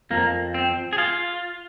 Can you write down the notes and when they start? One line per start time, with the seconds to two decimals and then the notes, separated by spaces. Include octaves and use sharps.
0.10 F2 F3 A#3
0.54 C4
0.93 G#4
0.98 F4